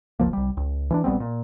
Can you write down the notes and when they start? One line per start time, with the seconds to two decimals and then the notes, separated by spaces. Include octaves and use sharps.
0.20 F1 C#2 F3 A#3
0.33 C2 G3
0.57 C#2
0.91 E3 C#4 D4
1.04 A#1 G3 B3 C4
1.20 A#2